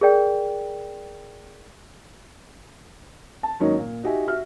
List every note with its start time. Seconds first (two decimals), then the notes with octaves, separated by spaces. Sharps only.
0.01 G#4 A#4 D5 G5
3.43 A5
3.60 G#2 D#3 F#3 A#3 C#4 D#4
3.78 A#2
4.03 D#4 F#4 G4 E5 G#5
4.28 F#4 E5 F6